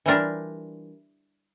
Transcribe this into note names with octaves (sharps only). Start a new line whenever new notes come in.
E3 G3 D4 F4 A#4